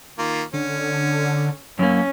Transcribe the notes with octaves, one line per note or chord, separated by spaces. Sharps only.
D#3 A#3 F4
D3 C#4
F#2 A#3 C#4